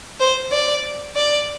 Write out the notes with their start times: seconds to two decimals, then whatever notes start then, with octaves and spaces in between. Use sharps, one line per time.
0.20 C5
0.52 D5
1.16 D5